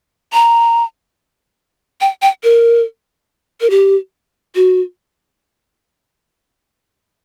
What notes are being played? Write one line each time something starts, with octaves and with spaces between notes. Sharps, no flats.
A#5
G5
G5
A#4
A#4
G4
F#4